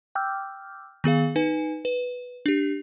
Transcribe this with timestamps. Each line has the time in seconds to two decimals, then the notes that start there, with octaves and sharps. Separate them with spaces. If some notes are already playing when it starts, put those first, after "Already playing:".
0.15 G5 D6 E6 F6 G6
1.04 D#3 B3 G#4 F5
1.36 D#4 B4 G#5
1.85 B4
2.46 D4 G4